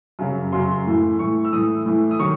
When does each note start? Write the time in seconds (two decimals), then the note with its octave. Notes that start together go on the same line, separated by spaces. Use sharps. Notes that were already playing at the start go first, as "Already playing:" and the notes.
0.19 F#2 C#3 F#3
0.52 F#2 C#3 F#3 C6
0.86 A2 E3
1.19 A2 E3 C#6
1.45 E6
1.53 A2 E3 D#6
1.86 A2 E3
2.11 D#6
2.19 D#3 F#3 C#6